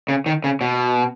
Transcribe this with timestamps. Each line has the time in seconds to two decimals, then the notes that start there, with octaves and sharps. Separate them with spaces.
0.09 C#3
0.26 D#3
0.44 C#3
0.61 B2